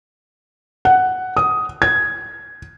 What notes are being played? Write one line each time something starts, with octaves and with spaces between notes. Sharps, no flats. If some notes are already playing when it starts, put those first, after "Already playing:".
F#5
D#6
G#6